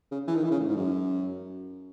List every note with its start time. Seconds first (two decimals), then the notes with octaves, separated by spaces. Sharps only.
0.11 C#3
0.28 E3
0.36 D#3
0.44 E3
0.51 C#3
0.60 A2
0.67 G#2
0.76 F#2